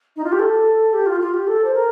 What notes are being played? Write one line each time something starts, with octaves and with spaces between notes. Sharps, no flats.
D#4
F4
G4
A4
G4
F4
F4
G4
A4
C5
A#4